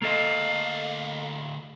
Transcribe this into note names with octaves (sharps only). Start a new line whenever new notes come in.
D2 A#3 A4 D#5 F5